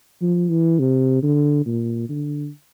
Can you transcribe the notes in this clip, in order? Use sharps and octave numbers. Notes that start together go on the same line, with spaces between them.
F3
E3
C3
D3
A#2
D3